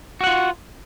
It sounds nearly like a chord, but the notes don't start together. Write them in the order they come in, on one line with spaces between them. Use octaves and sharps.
F#4 F#5 F4